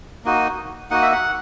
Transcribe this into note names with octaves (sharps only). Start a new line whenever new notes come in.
A#3 D#4 F#4
A#3 D#4 F#4 F#5
E5
F#5